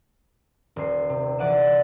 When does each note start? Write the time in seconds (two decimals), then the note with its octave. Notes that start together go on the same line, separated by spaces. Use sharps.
0.76 D#1 C7
1.09 C3
1.38 E3 D5 F#5 D#7 E7